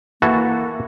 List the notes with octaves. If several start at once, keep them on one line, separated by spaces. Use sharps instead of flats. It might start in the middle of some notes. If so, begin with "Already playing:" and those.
E3 A#3 F#4 A4